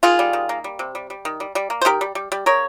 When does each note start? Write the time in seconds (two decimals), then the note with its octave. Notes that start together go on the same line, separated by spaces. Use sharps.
0.03 D#3 F4 G#4
0.19 G3
0.33 D#3
0.49 A#3
0.64 G3
0.79 C3
0.95 G3
1.10 G3
1.25 D#3
1.40 G3
1.55 G3
1.70 A#3
1.81 C5
1.85 D#3 G4 A#4
2.01 G3
2.15 G3
2.32 G3
2.46 C#3 A#4 C#5